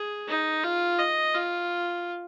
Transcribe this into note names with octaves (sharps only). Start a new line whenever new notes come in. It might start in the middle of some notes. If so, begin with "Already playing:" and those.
Already playing: G#4
D#4
F4
D#5
F4